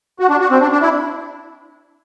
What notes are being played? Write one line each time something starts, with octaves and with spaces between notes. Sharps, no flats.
F#4
D4
F#4
C4
D4
D4
E4